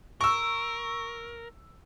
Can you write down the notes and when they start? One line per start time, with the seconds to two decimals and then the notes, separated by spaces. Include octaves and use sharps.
0.21 A#4 C#6 E6